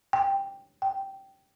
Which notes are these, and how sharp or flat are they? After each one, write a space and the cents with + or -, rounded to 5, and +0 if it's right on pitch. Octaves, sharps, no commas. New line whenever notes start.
G5 +10
G5 -10